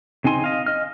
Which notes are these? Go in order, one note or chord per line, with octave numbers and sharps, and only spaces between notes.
C#3 C4 D#4 G#5 C6
D#5 F5
D#5 F6